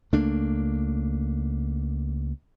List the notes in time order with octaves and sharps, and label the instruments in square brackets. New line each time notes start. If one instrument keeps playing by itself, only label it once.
[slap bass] C#2 A3 A#3 D4